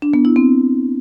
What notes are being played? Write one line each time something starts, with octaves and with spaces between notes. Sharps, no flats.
D4
B3
E4
C4